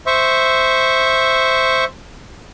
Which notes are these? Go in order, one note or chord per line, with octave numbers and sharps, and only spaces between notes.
C5 E5 C#6